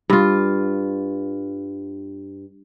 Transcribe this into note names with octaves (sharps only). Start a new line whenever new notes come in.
G2 F4